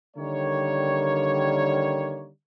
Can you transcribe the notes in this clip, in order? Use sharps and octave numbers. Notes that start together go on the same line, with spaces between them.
D3 D#3 G3 A#3 C#5